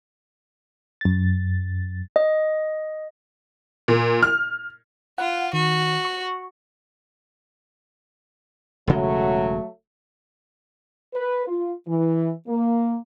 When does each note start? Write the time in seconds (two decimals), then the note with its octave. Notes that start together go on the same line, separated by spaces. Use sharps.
1.01 F#2 A6
2.16 D#5
3.88 A#2
4.23 F6
5.18 F4 F#5
5.53 D#3 F#4
6.05 C#6
8.87 E1 C#3 F#3 G#3 A3
11.14 B4
11.47 F4
11.87 E3
12.47 A#3